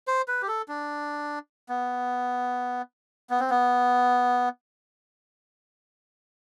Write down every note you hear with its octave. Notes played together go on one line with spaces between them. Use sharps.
C5
B4
G4
A4
D4
B3
B3
C4
B3